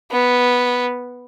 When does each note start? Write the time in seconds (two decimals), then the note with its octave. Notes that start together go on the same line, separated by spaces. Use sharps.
0.11 B3